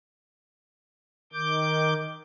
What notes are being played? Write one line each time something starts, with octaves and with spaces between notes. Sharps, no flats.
D#3 D6 G6